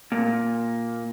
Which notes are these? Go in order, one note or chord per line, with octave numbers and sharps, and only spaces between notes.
A#2